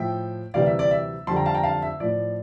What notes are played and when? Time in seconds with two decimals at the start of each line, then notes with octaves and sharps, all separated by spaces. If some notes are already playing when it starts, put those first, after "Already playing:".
Already playing: A2 F3 E5 G5
0.54 D2 C3 E3 G3 D5 F5
0.66 E5
0.79 D5
0.91 E5
1.27 F2 D3 G3 A5 C6
1.36 G5 A#5
1.46 F5 A5
1.55 G5 A#5
1.63 F5 A5
1.82 E5
2.00 A2 F3 D5